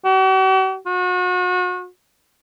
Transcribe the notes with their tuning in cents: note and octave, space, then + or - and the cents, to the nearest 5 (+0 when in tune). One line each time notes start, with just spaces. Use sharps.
F#4 +45
F#4 -35